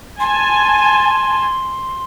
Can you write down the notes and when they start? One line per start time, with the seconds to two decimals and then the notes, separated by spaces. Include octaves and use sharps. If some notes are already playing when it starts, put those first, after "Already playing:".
0.20 G#5 A5 C6